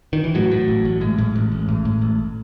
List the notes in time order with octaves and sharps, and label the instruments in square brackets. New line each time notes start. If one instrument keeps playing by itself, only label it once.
[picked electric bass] D#3
E3
A2 F#3
A2
A1
A1
A2 G#3
A2
A1
A1
A2
A2
A1